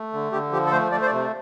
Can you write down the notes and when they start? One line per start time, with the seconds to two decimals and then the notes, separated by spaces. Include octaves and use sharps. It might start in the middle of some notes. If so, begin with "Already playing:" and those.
Already playing: A3
0.13 D3
0.32 D3 G4
0.52 F3 G4
0.66 A4
0.71 A3 C5
0.91 A3 D5
1.02 C5
1.06 D5
1.11 C3